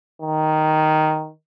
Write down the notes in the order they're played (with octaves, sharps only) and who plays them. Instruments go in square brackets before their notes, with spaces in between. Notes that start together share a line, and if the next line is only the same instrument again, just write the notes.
[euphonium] D#3